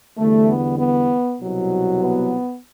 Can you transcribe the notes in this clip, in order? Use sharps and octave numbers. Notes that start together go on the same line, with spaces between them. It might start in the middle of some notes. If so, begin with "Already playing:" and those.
E2 D3 G3 A3
B3
B3
C2 B2 F#3
B3